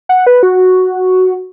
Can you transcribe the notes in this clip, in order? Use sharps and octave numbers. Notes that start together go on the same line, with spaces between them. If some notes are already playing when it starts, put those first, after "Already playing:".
F#5
B4
F#4